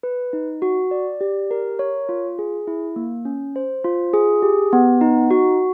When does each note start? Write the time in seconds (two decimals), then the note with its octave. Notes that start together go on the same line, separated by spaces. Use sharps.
0.03 B4
0.33 D#4
0.62 F#4
0.91 D5
1.21 G4
1.51 A#4
1.79 C#5
2.09 F4
2.39 G#4
2.67 E4
2.96 A#3
3.25 C#4
3.56 C5
3.84 F4
4.14 G#4
4.42 G4
4.73 B3
5.01 D#4
5.31 F#4